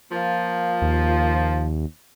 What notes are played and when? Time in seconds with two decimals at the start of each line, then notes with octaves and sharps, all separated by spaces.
0.12 F3 A#3
0.82 D#2